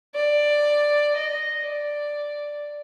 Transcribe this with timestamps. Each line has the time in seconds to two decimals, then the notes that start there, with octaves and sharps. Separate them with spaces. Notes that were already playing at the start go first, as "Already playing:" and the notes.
0.15 D5
1.16 D#5
1.66 D5